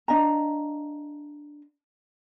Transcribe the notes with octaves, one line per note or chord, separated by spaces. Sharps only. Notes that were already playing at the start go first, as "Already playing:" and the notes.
D4 D#5 F5 A#5